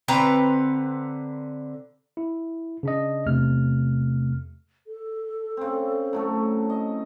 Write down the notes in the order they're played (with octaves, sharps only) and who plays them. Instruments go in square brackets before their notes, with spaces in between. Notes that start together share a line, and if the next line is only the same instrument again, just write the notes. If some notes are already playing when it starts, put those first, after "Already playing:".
[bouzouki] D3 C4 B4 A#5
[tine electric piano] E4
C#3 D4 D#5
E2 C3 A3 F6
[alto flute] A4
[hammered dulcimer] C#3 C4
A2 F#3 A3
D#5